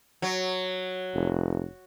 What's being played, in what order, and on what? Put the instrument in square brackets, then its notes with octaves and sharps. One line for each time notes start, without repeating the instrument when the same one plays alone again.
[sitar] F#3
[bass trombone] F1